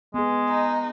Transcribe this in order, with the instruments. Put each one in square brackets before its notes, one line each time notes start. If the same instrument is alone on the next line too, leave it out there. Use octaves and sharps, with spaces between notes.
[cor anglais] G#3 [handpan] B3 G#4
[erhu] D#4